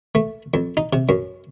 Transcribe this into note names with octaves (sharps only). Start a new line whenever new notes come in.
A3
F2
D#4
C3
F#2